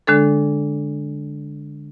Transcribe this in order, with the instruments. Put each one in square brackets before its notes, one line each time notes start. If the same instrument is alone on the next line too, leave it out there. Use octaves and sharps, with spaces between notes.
[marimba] D3 G#3 D4 A4